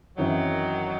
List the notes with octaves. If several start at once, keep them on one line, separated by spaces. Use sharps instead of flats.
F#2 D#3 E3 F#3 C4 E4